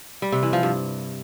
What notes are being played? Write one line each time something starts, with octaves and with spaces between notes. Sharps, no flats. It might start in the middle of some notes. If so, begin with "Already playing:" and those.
G3
C3
E3
F3
G2